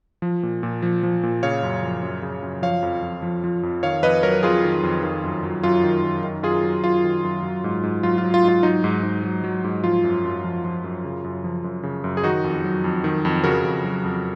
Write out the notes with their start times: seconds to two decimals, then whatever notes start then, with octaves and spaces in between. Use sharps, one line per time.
0.22 F3
0.43 A#2
0.63 A#2
0.82 F3
1.03 F3
1.23 A#2
1.43 C#3 C#5 F5
1.63 F#2
1.82 F3
2.03 F#2
2.22 C#3
2.43 F#2
2.62 F3 C#5 F5
2.83 F2
3.02 F2
3.22 F3
3.44 F3
3.63 F2
3.83 D#3 C#5 F5
4.03 F2 B4 D#5
4.23 F#3 A#4 C#5
4.43 F2 F4 G#4
4.64 D#3
4.83 F2
5.03 D#3
5.24 F#2
5.43 F#3
5.63 F#2 F4
5.84 D#3
6.04 F#2
6.23 D#3
6.43 F#2 F4 G#4
6.63 F#3
6.83 F#2 F4
7.04 D#3
7.24 F#2
7.43 F#3
7.64 G#2
7.83 G#2
8.03 F#3 F4
8.18 F4
8.24 F#3
8.34 F4
8.43 G#2
8.48 F4
8.63 F#3 D#4
8.84 G#2
9.03 G#2
9.24 F#3
9.44 F#3
9.64 G#2
9.84 F3 F4
10.04 F#2
10.24 F#2
10.44 F3
10.64 F3
10.84 F#2
11.04 C#3
11.24 F#2
11.44 F3
11.64 F#2
11.83 C#3
12.04 F#2
12.17 G#4
12.23 D#3 D#4 F#4
12.44 F2
12.64 F#3
12.84 F2
13.04 D#3
13.25 F2
13.44 C#3 F#4 A#4
13.64 F2
13.84 F#3
14.05 F2